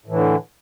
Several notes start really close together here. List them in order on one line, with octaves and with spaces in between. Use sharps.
A2 E3 D3